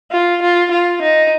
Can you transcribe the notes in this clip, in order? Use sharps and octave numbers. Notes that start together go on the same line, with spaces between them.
F4
F4
F4
D#4